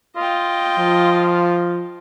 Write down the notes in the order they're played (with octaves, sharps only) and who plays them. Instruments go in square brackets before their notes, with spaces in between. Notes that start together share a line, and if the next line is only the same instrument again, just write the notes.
[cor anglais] F4 [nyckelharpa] D#5 G5
[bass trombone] F3